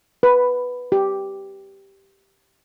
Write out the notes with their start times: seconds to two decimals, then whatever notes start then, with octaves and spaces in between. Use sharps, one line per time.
0.23 B4
0.92 G4